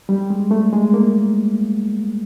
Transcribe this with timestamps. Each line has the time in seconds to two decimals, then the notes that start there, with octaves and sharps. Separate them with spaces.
0.09 G3
0.30 G#3
0.51 A3
0.73 G#3
0.94 A#3